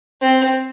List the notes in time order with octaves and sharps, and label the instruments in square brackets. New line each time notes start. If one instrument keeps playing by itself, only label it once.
[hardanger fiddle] C4